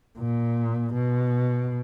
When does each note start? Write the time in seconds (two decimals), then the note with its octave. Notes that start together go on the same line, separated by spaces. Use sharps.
0.18 A#2
0.94 B2